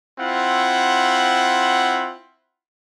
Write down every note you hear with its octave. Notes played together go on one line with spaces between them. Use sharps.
C4 E4 F4 F#5